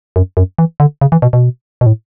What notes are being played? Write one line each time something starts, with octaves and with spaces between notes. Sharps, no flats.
F#2
F#2
E3
D3
C#3
E3
B2
B2
B2
A2